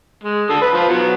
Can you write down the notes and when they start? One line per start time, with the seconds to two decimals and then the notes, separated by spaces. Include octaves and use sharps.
0.23 G#3
0.50 D3 A4 D#6
0.61 B4
0.73 F3
0.89 F#3 B3